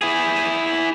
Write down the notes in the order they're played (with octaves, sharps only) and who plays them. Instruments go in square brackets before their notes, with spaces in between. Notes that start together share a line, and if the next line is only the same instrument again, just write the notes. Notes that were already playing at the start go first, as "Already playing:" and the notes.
[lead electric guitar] E4 G#4